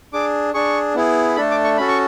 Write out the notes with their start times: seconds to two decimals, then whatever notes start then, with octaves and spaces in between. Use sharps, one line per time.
0.13 D4 G#4 D6
0.54 D4 G#4 C#6
0.95 B3 E4 G#4
1.36 A3 D4 A4 B5
1.51 D6
1.64 C#6
1.78 C#4 F#4 A4 B5
1.88 C#6